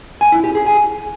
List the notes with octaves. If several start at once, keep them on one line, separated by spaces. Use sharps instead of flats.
G#5
E4
G4
G#4
G#5